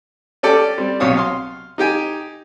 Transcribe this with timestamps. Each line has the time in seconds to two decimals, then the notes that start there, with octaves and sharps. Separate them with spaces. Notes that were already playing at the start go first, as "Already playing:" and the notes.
0.43 C#4 G4 A4 D5 G5
0.78 G3 C4
1.00 B1 C3 C#5 F5 D#6
1.17 F5 C6
1.78 D#4 G4 G5 G#5